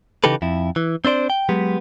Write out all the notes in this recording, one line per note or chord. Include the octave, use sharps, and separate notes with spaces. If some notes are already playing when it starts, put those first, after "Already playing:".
C#3 E3 D#4 G4 A4 B4
F2 E4
E3
C4 D4 C5 D5
G5
F#3 G#3 B3 G4